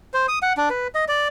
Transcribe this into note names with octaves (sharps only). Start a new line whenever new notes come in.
C5
D#6
F#5
D4
B4
D#5
D5